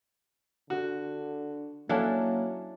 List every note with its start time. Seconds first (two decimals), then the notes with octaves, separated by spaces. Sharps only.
0.70 D3 F#4
1.89 F#3 A#3 C#4 D4 E4 A4 F5 F#5